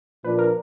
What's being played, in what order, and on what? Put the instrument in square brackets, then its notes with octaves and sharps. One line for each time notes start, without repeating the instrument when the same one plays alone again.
[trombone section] A#2 F3 A#3 D4 [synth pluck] B4
[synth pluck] A#4